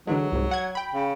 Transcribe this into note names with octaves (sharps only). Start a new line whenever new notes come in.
D3 E3 F#3 G#3
C2 G#2
F#5 G#6
G5 B5
C#3